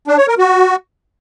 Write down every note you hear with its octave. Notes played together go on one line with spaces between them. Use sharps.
D4
C#5
A#4
F#4